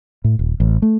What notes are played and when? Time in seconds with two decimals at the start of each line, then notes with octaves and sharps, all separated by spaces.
0.24 A2
0.39 D#1
0.60 A1
0.82 A3